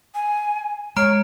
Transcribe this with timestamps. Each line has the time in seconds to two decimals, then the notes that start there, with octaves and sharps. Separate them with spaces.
0.14 G#5
0.97 G#3 C#5 A#5 F6 D7